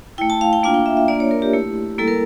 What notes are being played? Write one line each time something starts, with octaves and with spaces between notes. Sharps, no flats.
A3 E4 G5
A5
F5
G5
A#3 D4 F4 F5
G5
E5
E5
A#3 D4 F4 D5
C#5
A#4
G4
A3 E4
G3 A#3 E4 A4
A#4